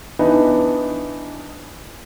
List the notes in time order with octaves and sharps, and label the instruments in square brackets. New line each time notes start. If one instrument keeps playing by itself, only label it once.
[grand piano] E3 B3 D4 D#4